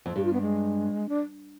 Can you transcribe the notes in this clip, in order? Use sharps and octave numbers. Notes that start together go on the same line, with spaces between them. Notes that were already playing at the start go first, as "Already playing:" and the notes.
F2
G2 G4
F4
B3
G#3
D4